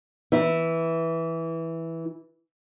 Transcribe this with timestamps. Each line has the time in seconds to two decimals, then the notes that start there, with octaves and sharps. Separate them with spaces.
0.32 E3 E4